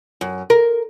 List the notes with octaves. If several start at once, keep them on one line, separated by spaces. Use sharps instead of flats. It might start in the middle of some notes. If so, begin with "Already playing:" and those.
F#2
A#4